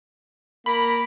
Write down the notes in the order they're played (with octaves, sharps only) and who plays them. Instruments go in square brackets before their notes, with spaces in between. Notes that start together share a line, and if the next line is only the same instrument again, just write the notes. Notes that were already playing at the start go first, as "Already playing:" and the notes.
[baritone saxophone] A#3 [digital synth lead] B5